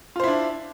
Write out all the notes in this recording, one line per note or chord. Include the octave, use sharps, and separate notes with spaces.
D4 E4 F4 C5